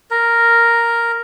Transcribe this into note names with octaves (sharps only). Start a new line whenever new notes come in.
A#4